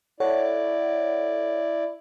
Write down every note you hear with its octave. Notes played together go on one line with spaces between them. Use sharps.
E4 A4 C#5 D5 F#5